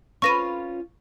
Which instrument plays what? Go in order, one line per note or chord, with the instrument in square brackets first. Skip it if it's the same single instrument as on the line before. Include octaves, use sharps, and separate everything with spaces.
[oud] C#4 F4 B4 [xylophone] C#6 A#6 D#7